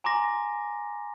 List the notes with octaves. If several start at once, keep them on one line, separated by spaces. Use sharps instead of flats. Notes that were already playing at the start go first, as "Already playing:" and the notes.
G#5 A#5 C6 D6 A#6